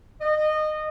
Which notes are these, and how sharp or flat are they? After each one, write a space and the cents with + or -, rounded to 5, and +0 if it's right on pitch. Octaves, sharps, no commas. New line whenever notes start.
D#5 -20